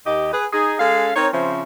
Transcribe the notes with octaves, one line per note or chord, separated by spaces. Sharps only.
D#2 G4 D#5
G#4 B4
D#4 G#4
G#3 C#4 A4 F5
C4 D#4 A#4 C#5
C#3 F3 C4 C#4 C5 E5